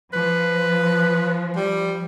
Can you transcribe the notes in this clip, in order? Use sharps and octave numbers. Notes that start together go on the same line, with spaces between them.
F3 B4
G3